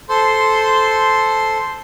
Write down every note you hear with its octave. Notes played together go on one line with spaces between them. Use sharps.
A4 C5 C6